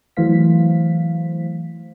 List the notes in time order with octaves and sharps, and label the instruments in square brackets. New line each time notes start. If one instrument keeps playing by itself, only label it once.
[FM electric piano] E3 F#3 A3 C5 F5 B6